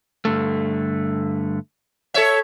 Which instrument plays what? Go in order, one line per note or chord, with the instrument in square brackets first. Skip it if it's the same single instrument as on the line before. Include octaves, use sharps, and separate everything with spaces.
[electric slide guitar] G2 D3 A3
[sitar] A4 C#5 E5